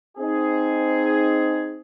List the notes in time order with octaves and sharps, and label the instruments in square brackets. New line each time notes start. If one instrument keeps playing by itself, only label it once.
[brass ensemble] C4 D#4 G#4